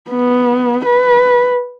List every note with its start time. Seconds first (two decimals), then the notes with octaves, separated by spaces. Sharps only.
0.10 B3
0.85 B4